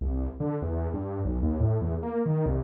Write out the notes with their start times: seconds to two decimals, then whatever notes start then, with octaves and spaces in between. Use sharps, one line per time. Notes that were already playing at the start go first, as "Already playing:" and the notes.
0.01 C2
0.40 D3
0.62 E2
0.93 G2
1.25 B1
1.42 D#2
1.60 A2
1.81 E2
2.03 A#3
2.26 D#3
2.46 C2